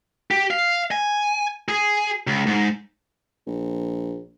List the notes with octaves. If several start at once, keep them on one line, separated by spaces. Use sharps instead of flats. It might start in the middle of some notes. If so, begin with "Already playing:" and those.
G4
F5
G#5
G#4
C#2
G#2
A#1